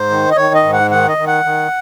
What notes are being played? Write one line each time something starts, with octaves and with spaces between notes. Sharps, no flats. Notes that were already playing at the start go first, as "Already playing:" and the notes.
Already playing: G#2 C5
D#3
D#5
D#3 C#5
D#5
G#2
F#5
D#3 F#5
D#5
D#3
F#5
D#3